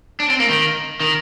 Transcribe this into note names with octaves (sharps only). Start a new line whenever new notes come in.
D4
C4
A#3
D#3
D#3